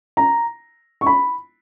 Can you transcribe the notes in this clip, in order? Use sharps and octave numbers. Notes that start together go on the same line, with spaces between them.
A#5
C#6
B5